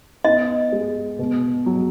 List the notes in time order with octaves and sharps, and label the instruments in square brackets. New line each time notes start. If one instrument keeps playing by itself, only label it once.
[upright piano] B3 [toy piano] D#5
[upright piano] G#3
B2
F#3